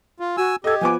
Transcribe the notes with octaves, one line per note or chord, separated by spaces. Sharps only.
F4
F#4 G#5 E6
G4 A4 D#5 G#6
F3 B3 G#5 D6